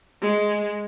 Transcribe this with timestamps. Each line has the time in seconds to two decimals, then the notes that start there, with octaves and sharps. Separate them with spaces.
0.22 G#3